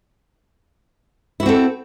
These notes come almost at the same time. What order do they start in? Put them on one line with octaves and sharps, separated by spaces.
E4 F#4 C4 A4